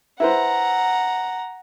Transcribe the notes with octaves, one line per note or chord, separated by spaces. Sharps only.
E4 B4 C5 F#5 A#5